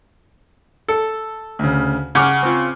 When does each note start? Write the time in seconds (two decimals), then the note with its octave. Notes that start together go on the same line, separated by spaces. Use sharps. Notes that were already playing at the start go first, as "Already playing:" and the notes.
0.89 A4
1.59 D2 C#3
2.15 C#3 F#5 D6 F6
2.43 C4 F4